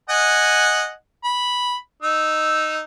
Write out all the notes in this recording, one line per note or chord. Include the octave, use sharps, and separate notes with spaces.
D#5 F#5 G#5
B5
D#4 E6